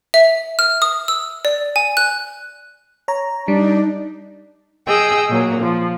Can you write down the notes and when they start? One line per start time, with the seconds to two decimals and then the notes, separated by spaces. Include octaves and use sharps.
0.14 E5
0.59 F6
0.82 D#6
1.08 E6
1.45 D5
1.76 G#5
1.97 F#6
3.08 C#5 A#5
3.48 G3 D4 D#4
4.87 G#4 D#5 G5 E6
5.29 A#2 F#3 A#3
5.62 F3